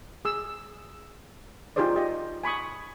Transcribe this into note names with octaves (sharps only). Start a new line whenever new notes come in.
G#4 E6
D#4 F4 G4 G#4 C5 D5
G4 D#5
G#5 B5 C#6 D#6